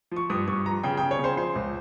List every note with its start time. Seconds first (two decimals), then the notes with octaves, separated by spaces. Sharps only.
0.11 F3 C#6
0.30 G2 D#6
0.48 G2 C#6
0.65 F3 A#5
0.83 C#3 G5
0.97 C#3 G5
1.11 C#5
1.19 C#3 C5
1.37 F3 C5
1.55 C#2